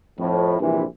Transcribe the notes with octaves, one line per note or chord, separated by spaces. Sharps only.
F2 A2
A#1 G2 C3 E3